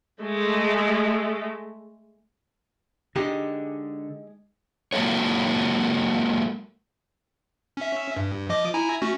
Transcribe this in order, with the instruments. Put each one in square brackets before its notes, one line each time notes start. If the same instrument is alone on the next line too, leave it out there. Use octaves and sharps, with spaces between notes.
[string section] G#3 A3
[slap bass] D3 [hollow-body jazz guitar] G#3 D#4 G4
[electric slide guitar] F#3 G#3 A#3 A4 C#5
[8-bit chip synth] C#4 E5
G2
F3 D#5 D6
E4 G#5 A#5
A3 C#4 F#4